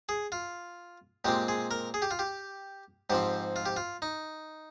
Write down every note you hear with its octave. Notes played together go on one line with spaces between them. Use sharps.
G#4
F4
A#2 G#3 C4 G4
G#4
A#4
G#4
G4
F4
G4
G#2 F3 C4 G4
F4
G4
F4
D#4